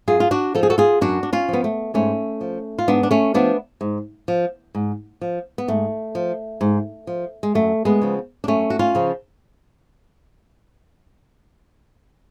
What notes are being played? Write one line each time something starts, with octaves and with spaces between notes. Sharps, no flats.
F#2 F4 G#4
F4
D4 F#4
F3 A4
G#4
F#4 A4
F4 G#4
F#2 D4 F#4
D4
C#4 F4
F3 B3
A3
G#2 A3 C#4
F3
F4
G#2 B3 D4
D4
A3 C#4
F3 B3 D4
G#2
F3
G#2
F3
B3
G#2 A3
F3
G#2
F3
G#3
F#2 A3
G#3 B3
C#3 F3
D4
F#2 A3 C#4
F#4
C#4 F4
C#3 F3